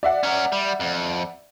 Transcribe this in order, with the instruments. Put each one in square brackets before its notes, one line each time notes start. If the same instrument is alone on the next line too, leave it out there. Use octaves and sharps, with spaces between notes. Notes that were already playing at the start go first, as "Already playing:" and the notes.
[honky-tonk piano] D5 E5 F#5
[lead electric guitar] C#4 A#4
G3
F2